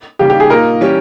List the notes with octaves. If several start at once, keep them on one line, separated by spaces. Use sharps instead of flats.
C#3 G3 A#3 G4
G4
G#4
A#2 A#3 D#4 A#4
E3 G3 C#4 G4